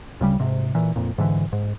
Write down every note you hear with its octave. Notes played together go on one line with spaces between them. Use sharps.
D2 C#3 G3
G#2 C3
A#2 E3
F2 A#2
G#2 D3 E3
G#2